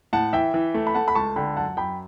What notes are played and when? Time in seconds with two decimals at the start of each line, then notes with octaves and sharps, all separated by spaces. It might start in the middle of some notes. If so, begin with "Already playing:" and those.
0.13 A2 F#5 A5
0.33 E3 E5 G5
0.54 E3
0.74 A3
0.87 B5
0.94 A3 F#5 A5
1.08 B5
1.15 C#2 A5 C#6
1.36 D3 G5 B5
1.56 F#2 F#5 A5
1.77 F#2 G5 B5